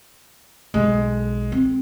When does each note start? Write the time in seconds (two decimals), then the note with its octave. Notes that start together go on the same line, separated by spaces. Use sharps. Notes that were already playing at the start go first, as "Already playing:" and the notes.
0.74 B1 G#3
1.52 C4